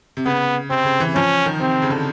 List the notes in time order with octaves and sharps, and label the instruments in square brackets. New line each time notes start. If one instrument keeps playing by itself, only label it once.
[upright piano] C3
[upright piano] C#3 [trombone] B3
[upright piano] C3 [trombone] C4
[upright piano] C#3
E3
[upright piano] F3 [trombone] C#4
[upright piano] D#3
[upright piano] C3 [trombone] C4
[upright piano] C#3
D3